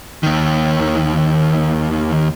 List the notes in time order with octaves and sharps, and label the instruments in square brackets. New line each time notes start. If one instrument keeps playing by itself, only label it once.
[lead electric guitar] D#2 D#3